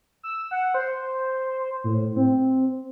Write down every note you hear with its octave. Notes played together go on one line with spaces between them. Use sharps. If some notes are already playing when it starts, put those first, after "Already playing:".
E6
F#5
C5
A2
C4